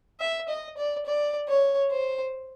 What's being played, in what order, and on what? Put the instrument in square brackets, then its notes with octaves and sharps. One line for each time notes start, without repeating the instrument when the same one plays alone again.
[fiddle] E5
D#5
D5
D5
C#5
C5